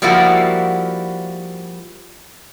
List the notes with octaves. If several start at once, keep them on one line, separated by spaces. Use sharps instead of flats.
F3 G3 A#3 E4 F#4